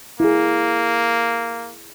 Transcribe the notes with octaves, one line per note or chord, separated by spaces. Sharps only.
A#3 E4 G#4